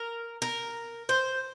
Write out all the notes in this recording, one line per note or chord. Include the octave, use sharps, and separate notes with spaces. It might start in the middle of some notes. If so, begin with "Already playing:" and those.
Already playing: A#4
A#4
C5